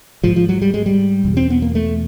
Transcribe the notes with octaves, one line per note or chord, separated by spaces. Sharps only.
G#2 F3
F3
F#3
G3
G#3
G3
E2 B2
C4
B3
A#3
A3